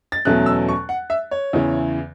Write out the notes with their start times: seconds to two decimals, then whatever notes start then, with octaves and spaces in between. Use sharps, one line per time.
0.12 A6
0.25 E2 B2 F#3 A3 C#4 F#6
0.46 E6
0.69 C#6
0.89 F#5
1.10 E5
1.31 C#5
1.53 E2 C#3 E3